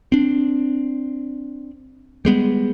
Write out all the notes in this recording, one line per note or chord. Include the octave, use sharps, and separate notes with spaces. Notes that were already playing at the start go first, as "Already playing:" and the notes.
C4 D4
G3 G#3 B3